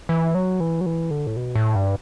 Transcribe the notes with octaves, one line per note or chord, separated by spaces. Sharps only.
E3
F#3
E3
F#3
E3
D3
A2
B2
A2
G2